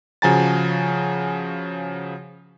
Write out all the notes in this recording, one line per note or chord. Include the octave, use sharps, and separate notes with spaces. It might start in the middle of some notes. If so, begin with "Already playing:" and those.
C#3 F3 F#4 G#5 A#5 A6